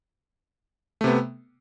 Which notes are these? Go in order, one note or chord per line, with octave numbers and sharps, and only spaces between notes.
C3 A3 B3